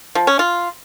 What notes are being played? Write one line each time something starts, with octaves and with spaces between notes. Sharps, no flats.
F3
C#4
F4